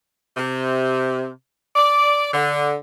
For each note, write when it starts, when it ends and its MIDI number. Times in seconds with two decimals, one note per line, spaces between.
0.37 1.28 48
1.76 2.28 74
2.33 2.76 50